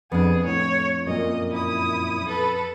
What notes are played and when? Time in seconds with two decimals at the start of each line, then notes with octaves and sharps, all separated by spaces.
0.12 F2 B3 D4 G#4
0.46 A2 C#5
1.07 F#2 A#2 D#5
1.51 E4 D#6
2.27 A4 B4